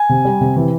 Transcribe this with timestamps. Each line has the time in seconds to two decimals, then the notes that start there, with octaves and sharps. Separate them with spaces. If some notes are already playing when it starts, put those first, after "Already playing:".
Already playing: G#5
0.09 C3
0.25 G3
0.41 C3
0.56 E3